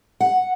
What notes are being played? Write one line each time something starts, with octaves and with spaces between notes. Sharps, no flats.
F#5